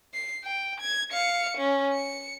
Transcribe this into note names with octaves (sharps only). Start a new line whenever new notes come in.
C7
G5
G#6
F5 C#7
C#4
C#7